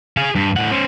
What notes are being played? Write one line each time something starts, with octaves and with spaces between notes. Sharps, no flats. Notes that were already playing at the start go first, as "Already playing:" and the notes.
G#4 F5
G2
A2 F#5
C#4 C5